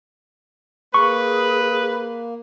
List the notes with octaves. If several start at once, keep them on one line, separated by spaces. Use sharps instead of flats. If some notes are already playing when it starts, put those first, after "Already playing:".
A#3 G#4 B4 C#6